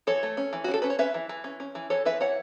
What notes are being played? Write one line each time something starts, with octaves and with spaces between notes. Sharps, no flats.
E3 A4 C#5
A3
C#4
E3
F#4
C#4
A4
C#4 B4
C#5
C#4 B4 E5
E3
E3
C#4
C#4
E3
E3 A4 C#5
E3 B4 E5
E3 C#5 F#5